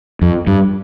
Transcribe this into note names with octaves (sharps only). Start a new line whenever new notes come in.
F2
G2